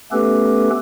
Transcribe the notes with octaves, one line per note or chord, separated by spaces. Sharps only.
A3 B3 C#4 G4 A4 B4